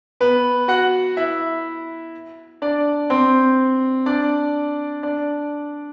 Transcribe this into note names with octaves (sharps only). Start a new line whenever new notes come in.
B3 B4
F#4 F#5
E4 E5
D4 D5
C4 C5
D4 D5
D4 D5